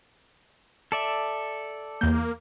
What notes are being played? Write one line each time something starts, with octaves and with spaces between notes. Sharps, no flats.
A4 D5 E5
E2 A#3 G6